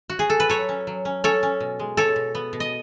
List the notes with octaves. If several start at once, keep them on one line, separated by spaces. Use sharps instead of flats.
F#4
G#4
A4
B4
F#3 A4 C#5
C#4
F#3
C#4
C#4 A4 C#5
C#4
B2
G#3
B2 A4 C#5
B2
B3
B2
D#5